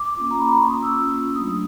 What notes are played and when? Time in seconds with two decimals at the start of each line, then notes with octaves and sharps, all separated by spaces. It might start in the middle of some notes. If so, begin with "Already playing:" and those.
Already playing: D6
0.17 A#3 C#4 F4
0.31 A#5
0.39 B5
0.48 C6
0.56 A#3 C#4 F4 C#6
0.70 D#6
0.83 E6
0.96 A#3 C#4 F4
1.35 F#3 A3 D4 D#6